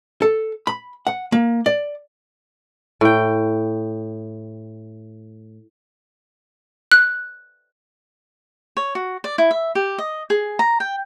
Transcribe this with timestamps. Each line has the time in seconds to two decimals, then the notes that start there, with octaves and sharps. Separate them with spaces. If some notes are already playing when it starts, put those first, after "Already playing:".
0.22 A4
0.67 B5
1.07 F#5
1.32 A#3
1.66 D5
3.01 A2 G5
6.92 F#6
8.77 C#5
8.95 F#4
9.24 D5
9.38 E4
9.51 E5
9.75 G4
9.98 D#5
10.30 G#4
10.59 A#5
10.80 G5